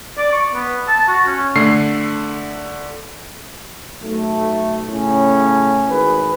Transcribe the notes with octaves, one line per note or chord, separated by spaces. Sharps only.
D5
C#6
B3
A5
F#4
C#4
D3 A3 C7
B1 A3
A2 C#3 C#4
G#1 G#4 B4